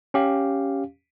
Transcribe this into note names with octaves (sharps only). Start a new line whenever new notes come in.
C#4 G4 F5